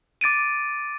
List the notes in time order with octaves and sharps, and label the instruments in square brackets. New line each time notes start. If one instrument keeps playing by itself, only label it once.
[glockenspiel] D6 A6 D7 D#7